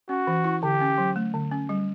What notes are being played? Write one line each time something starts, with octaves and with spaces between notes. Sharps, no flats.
C#4 F#4
E3
E4
D3 G4
C#4
F#3
A3
D3
C#4
G3